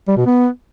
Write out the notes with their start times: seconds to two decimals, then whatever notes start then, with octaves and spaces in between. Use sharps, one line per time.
0.08 G3
0.17 B2
0.26 B3